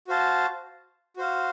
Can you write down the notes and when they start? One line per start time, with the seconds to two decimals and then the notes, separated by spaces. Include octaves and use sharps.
0.08 F#4 C5 F5 A5
1.17 F#4 C5 F5